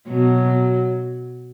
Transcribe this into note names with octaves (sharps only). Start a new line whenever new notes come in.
B2 F#3